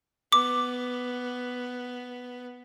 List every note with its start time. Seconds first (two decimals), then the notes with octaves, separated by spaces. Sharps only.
0.32 B3 D6